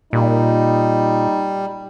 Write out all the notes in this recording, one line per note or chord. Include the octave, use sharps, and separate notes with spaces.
A#2 G3 D#4